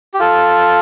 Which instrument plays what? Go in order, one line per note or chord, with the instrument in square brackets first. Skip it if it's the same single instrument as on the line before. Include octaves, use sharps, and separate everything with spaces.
[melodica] G4
F4 A4